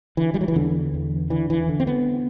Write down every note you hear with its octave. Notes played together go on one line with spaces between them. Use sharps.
D3 E3
G3
F#3
E3
E2 D3
E2
D3 E3
E3
D3
C4
B3